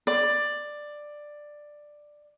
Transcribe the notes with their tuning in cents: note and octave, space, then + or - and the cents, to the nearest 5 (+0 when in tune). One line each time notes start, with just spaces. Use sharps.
D5 +10